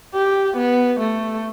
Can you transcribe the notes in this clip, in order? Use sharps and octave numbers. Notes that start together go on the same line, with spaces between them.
G4
B3
A3